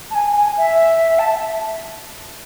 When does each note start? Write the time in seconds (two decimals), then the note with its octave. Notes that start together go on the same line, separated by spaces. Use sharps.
0.11 A5
0.15 G#5
0.37 G#5
0.58 E5
1.19 A5